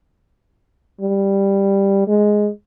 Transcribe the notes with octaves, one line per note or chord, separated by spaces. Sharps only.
G3
G#3